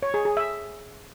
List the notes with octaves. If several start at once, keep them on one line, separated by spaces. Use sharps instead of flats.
C#5
G#4
G#4
E5